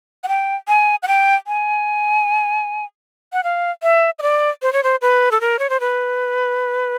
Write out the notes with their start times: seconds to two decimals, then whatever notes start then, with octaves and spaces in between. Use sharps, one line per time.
0.24 F#5
0.28 G5
0.68 G#5
1.03 F#5
1.08 G5
1.47 G#5
3.33 F#5
3.44 F5
3.83 E5
4.19 D#5
4.22 D5
4.62 C5
4.73 C#5
4.83 C5
5.02 B4
5.32 A4
5.41 A#4
5.59 C#5
5.70 C5
5.80 B4